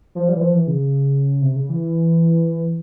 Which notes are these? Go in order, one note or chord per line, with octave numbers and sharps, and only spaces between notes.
F3
G3
E3
F3
E3
C#3
C3
C#3
E3